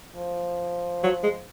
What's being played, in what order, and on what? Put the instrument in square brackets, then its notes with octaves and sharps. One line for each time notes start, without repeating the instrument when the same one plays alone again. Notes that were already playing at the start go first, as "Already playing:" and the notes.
[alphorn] F3
[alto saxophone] F#3
G#3